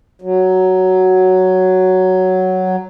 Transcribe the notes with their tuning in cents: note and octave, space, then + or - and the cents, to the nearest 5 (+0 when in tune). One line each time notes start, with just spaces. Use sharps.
F#3 +5